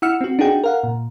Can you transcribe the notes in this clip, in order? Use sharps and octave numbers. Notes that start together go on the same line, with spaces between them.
E4 F#5 E6 F6 C#7
C4 F#4
D4 D#4 F#4 G#4 G5
A#4 F5 F#5
A#2